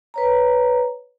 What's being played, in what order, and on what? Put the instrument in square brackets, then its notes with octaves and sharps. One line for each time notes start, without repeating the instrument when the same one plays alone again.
[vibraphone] B4 C#5 A#5